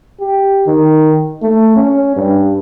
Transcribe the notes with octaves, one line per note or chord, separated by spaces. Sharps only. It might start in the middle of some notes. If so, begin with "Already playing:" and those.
G4
D#3
A3
C#4
G2